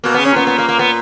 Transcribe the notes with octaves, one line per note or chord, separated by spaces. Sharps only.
B2 A#3
C#3 B3
C#4
A#2 B3
B3
A#3
A#3
B3